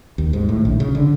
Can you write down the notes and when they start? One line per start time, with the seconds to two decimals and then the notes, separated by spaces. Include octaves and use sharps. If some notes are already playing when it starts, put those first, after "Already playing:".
0.18 D#2
0.33 G#2
0.49 A2
0.65 A#1
0.80 C#3
0.95 D3